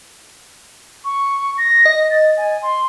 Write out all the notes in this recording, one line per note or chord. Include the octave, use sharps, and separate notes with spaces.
C#6
A#6
D#5
A6
G#5
C6